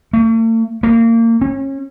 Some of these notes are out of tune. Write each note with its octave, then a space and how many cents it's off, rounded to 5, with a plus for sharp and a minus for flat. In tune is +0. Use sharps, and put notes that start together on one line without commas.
A3 +45
A#3 -30
C#4 -30